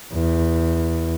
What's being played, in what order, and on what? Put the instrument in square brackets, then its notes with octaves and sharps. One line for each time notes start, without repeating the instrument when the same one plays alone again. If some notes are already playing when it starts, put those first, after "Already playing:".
[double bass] E2